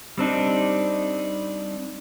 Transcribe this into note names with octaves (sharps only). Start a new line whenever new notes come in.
G3 C4 D4 D#4